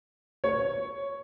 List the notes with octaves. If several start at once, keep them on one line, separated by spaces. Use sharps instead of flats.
C#5